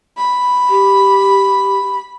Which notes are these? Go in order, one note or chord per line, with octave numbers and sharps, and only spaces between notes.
B5
G4